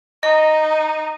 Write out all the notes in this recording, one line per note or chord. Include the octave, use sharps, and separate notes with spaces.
D#4 D#5